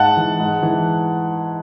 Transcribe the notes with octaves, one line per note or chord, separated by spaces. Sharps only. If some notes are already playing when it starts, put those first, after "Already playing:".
Already playing: G#2 F#5 A5
E3
G#2
E3